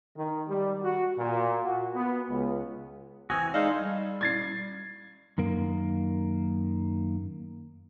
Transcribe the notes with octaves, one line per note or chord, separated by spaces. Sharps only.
D#3
G3
F#4
A#2
F#4
B3
C#2
E3 C4 F#4 G#5 D#6 E6 A#6
G#3 D#4 A4 C5 D5 D#5 F5
G3
G#6 A6 C7
F#2 D#3 A#3